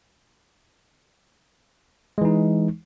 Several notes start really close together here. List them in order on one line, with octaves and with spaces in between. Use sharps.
G#3 E3 D#4